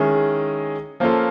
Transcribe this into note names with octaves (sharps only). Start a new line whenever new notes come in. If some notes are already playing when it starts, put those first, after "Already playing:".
Already playing: D#3 G#3 C#4 E4 G#4
F3 A#3 C#4 F4 A4